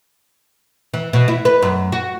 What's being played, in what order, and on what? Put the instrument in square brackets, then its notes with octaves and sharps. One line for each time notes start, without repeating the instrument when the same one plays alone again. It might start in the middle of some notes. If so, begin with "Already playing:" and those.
[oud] E3
B2
E4
B4
F#2
F#4